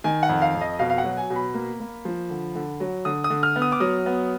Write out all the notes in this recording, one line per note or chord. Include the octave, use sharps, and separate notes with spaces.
D#3 G#5
F#5
F2
F5
F2
D#5
B2 F5
F5
F#5
F#3
G#5
B2
B5
A#3
A#3
F3
D3
D3
F#3
D3 D#6
D#6
D3
F6
B3
D#6
D6
F#3 D#6
B3